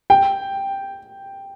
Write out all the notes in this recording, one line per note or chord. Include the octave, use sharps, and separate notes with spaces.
G5